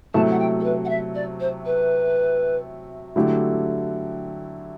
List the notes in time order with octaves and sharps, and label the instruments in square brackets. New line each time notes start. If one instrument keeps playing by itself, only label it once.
[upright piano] C3 F#3 A3 E4 [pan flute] A5
[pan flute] F#5
G5
A4
B4
F#5
E5
D5
C5
B4
[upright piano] D3 F#3 A3 E4 G4